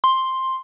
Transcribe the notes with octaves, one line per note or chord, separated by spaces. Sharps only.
C6